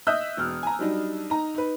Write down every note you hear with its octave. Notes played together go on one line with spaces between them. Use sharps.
D#5 E5 D#6 E6 F#6 G6
E1 F6
G#5 A#5
F#3 G3 D4 D#4
D#4 A#5
D#4 B4